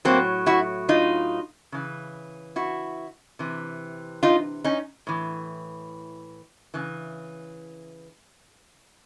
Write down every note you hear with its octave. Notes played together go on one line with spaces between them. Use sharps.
A2 F#3 A#3 C4
E4 F#4
D#4 F4
C#3 E3
E4 F#4
C3 E3
D#4 F4
C#4 D#4
A2 E3
C#3 E3